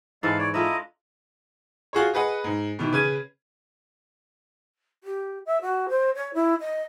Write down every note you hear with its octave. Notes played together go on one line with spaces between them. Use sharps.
G#2 E3 G#3 E4 A4 F5
C#5 D5
D4 E4 F4 A4 D#5 A#5
F4 F#4 G#4 C#5
G#4 B4 D#5 F#5
G#2
B2 D#3 E3
C#3 B4 G#6 D#7
G4
E5
F#4
C5
C#5
E4
D#5